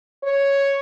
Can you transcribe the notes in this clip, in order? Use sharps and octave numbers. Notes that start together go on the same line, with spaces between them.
C#5